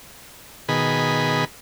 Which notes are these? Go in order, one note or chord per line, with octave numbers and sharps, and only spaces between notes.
B2 D#3 G#4 B5